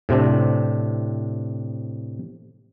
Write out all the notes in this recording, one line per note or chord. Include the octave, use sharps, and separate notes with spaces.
A2 C3 C4 D4